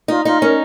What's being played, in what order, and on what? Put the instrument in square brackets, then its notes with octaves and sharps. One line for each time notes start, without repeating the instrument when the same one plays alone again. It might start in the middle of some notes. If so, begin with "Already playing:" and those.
[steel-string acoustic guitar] D#4 [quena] F4
[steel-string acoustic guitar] D#4 [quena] F4
[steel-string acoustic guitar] C#4 [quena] A#4